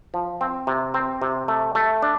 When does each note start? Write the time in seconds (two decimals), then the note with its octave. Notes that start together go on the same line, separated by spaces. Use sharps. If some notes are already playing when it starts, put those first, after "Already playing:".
0.14 F3
0.41 C4
0.67 C3
0.94 C4
1.22 C3
1.48 A3
1.75 A3
2.02 D4